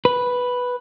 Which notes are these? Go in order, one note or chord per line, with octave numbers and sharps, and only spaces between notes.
B4